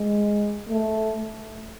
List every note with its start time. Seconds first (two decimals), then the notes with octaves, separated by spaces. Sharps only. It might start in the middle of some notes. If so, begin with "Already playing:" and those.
Already playing: G#3
0.69 A3